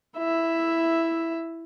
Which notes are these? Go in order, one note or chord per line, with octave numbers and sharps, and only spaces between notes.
E4 E5